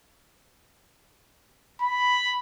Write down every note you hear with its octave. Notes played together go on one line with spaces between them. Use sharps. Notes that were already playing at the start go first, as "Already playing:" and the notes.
B5